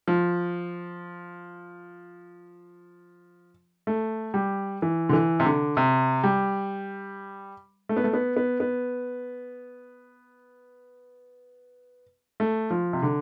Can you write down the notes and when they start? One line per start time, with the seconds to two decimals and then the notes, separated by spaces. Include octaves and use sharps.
0.08 F3
3.87 A3
4.34 G3
4.82 E3
5.09 D3
5.13 E3
5.40 C3
5.45 D3
5.77 C3
6.24 G3
7.89 A3
7.97 B3
8.04 A3
8.14 B3
8.37 B3
8.60 B3
12.40 A3
12.70 F3
12.93 C3
13.03 D3